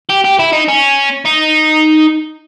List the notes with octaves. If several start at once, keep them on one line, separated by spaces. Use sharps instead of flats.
G4
G4
E4
D#4
C#4
D#4